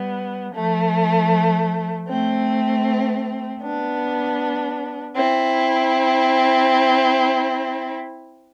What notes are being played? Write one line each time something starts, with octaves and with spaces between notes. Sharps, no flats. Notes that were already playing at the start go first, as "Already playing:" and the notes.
Already playing: G3 B3
F3 A3
A3 C4
B3 D4
C4 E4